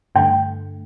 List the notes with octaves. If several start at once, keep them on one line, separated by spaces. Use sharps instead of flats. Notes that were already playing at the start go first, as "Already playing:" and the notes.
G2 D3 A3 G5